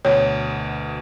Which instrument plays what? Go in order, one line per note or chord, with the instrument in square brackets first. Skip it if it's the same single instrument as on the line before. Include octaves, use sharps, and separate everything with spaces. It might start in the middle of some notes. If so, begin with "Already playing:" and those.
[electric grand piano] D2 B2 [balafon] C#5